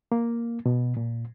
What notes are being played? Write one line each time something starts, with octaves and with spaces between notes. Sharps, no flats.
A#3
B2
A#2